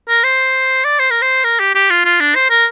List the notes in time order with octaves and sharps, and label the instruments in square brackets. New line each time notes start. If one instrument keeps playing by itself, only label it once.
[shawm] A#4
C5
D5
C5
A#4
C5
A#4
G4
G4
F4
F4
D4
C5
A#4